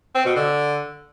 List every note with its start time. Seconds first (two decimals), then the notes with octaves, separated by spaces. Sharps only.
0.15 C4
0.25 B2
0.36 D3